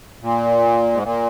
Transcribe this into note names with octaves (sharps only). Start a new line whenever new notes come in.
A#2
G#2
A#2